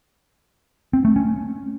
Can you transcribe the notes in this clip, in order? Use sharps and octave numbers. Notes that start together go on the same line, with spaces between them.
C4
A3
C#4